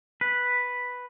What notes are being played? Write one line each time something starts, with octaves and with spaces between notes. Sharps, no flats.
B4